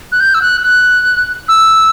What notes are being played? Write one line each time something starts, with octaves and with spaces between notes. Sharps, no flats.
F#6
G6
E6
F#6
F#6
E6